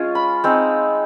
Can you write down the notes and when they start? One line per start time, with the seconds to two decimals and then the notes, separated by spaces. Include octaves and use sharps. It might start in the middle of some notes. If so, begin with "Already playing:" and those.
Already playing: G#3 C#4 F4
0.15 B5
0.44 G#3 C4 D#4